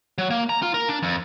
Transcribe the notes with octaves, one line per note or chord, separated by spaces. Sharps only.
F#3
A#3
A#5
F4
A#4
D4
F2